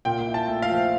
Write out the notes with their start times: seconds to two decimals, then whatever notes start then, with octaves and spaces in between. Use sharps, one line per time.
0.05 A#2 G5
0.27 E4
0.34 A5
0.48 A3
0.62 F5
0.69 F3